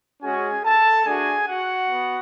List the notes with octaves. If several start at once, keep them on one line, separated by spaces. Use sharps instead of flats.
G#3 C#4 F#4 G#4 G#5
A4 A5
A3 D4 F#4 G#4 G#5
F#4 F#5
B3